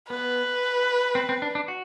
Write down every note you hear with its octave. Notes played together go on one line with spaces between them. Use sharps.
B3 B4
C4
C4
D4
D4
F#4